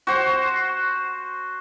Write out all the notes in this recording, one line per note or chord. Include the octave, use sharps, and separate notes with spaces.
F#4 C5